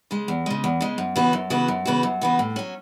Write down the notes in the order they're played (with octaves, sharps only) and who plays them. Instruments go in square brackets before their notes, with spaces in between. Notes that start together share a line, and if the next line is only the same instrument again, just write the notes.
[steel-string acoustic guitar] C#3 G#3
E2
C#3 G#3
E2
C#3 G#3
F#2
C#3 E3 B3 F#4
F#2
C#3 E3 B3 F#4
F#2
C#3 E3 B3 F#4
F#2
C#3 E3 B3 F#4
A2
F#3 C#4